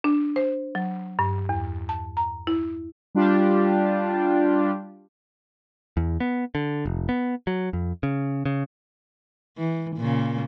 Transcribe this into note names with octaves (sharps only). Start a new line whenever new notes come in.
D4
C5
F#3
G2
E2
A5
A#5
E4
G3 D4 F4 G4
E2
B3
D3
F1
B3
F#3
F2
C#3
C#3
E3
A#2 C#3